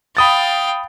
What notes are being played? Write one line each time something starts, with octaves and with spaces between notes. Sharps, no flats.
F5 G5 B5 D#6 A6